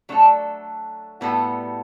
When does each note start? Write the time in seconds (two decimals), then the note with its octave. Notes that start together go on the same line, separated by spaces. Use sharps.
0.09 F#3 A3 D4 A4
1.21 A2 G3 B3 F#4 A4